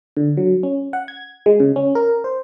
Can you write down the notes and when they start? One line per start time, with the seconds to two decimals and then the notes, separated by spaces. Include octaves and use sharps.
0.17 D3
0.37 F#3
0.63 C#4
0.93 F#5
1.08 G#6
1.46 G#3
1.60 C#3
1.76 C#4
1.95 A#4
2.24 C5